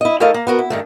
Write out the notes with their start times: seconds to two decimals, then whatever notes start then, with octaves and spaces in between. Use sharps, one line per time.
0.01 E4 D#5
0.20 A3 E4 A4 A#4 D#5 F5
0.34 A#3
0.47 B3 F#4 A#4
0.59 E4
0.70 G2 D#3 A3